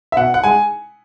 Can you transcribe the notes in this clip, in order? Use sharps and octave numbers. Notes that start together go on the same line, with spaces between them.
E5
B2 F#5
F#5
G#3 G#5